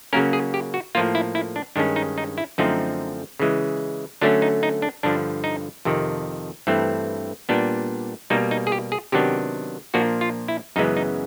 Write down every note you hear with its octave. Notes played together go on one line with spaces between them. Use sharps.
C#3 F#3 A#3 C#4 A#4
G#4
G4
F#4
A2 F3 A#3 F4
E4
E4
D4
G2 D#3 G#3 C#4 D4
D#4
D#4
E4
F#2 D3 F3 A3 C4 D#4
C#3 E3 G#3
D3 F#3 A3 C#4 D4
D#4
D#4
D4
G2 D3 F3 D4
D#4
F2 C3 D#3
G2 E3 A3 C4
A#2 G3 B3 D4
B2 G3 A#3 D#4
D#4
G#4
G4
G#4
C3 D#3 F#3 B3 D4 G4
A#2 F3 A#3 D4 F#4
F4
E4
F#2 C#3 E3 G#3 B3 D#4
D#4